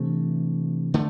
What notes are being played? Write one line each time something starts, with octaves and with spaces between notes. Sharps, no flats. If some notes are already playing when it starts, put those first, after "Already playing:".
Already playing: C3 E3 A3 D4
D3 A3